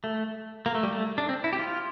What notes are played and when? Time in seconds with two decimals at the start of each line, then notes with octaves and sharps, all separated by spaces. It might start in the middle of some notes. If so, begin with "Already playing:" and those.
0.04 A3
0.66 A#3
0.75 A3
0.83 G3
0.92 A3
1.18 D4
1.29 C4
1.44 E4
1.53 G4
1.59 F4